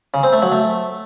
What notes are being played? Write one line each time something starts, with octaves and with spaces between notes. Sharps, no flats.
C#3
C4
A3
F#3
A3